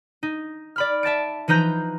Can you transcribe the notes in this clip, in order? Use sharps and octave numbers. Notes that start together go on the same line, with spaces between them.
D#4
D5 B5 F6
E5 A5 A6 D7
E3 F3 D#4 B4 A#5 G6